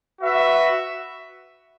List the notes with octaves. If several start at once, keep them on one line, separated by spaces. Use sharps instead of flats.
F#4 B4 E5